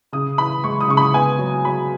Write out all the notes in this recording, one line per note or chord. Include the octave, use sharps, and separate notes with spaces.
C#3 D#6
E3 B5
G#3 C#6
D#6
C#3 C#6
B5
B3 G#5
F#3
F#3 B5